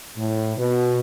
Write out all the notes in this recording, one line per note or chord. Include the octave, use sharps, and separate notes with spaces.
A2
B2